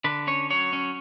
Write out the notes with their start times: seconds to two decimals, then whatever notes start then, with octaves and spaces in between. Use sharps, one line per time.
0.04 D3 B4
0.27 C#4 C#5
0.50 F#3 C#5
0.73 C#4